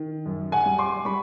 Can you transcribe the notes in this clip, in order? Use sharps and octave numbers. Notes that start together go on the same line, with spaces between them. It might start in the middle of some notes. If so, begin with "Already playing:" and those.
Already playing: D#3
F#2
F#5 G#5
G3
C6 D6
G3 B5 C#6